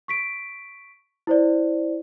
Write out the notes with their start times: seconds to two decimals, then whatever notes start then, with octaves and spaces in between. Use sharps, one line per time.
0.08 C#6 B6 D7
1.27 E4 C5 D5